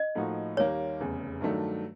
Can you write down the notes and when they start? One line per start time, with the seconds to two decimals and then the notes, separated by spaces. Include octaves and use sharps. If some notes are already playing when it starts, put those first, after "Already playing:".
Already playing: D#5
0.15 A2 F3 A#3 D#4 F#4
0.57 D#2 D#3 G3 A#3 C#5
1.00 F1 E2 C#3
1.41 G2 D#3 F#3 A3 D4